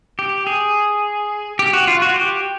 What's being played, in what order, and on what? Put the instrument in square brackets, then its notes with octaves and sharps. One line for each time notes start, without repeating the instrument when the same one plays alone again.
[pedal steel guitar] G4
G#4
G4
F#4
F4
F#4
G4